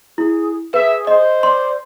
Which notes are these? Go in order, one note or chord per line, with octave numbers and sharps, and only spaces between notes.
E4 G#4
G#4 B4 E5
C5 D#5
D5 C6